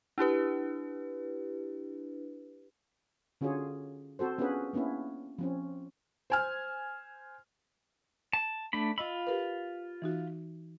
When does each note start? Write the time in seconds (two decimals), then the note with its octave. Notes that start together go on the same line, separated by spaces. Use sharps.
0.18 D4 E4 G4 B4
3.41 D3 C#4 F4 F#4 G#4 C#5
4.19 C4 F#4 A4 C5
4.38 B3 C#4 D4 F4 G#4 B4
4.73 A#3 B3 C#4 D4 E4
5.39 F3 C4 C#4
6.30 C5 G#5 F6
8.33 A5
8.73 A3 D4 B5
8.98 F4 D#5 B5 E6
9.27 G4 A#4 B4
10.02 E3 D#4 F#4